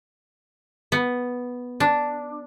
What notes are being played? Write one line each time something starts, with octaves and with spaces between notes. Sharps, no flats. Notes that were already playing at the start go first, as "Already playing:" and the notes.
B3
D4